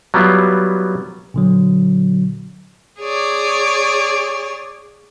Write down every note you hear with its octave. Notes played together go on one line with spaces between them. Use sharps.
F#3 G3 B3 E4 F4
A#2 D3 F#3
G#4 C#5 D5